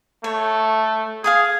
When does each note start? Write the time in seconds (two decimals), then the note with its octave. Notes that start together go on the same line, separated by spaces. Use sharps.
0.24 A3 C#5
1.24 G#4 F5 G#5 D#6